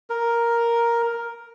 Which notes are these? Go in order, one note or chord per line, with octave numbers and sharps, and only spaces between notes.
A#4